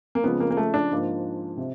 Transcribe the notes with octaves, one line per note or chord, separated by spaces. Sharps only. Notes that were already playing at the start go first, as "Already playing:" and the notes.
A#3
C#3 F3 G#3 B3
A#3
A#3
A3
D4
G#2 F3 A#3 D4
C3